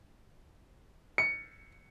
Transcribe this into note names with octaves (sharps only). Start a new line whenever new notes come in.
C#7